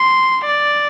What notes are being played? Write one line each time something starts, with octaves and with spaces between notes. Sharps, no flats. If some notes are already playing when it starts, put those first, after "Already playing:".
Already playing: C6
D5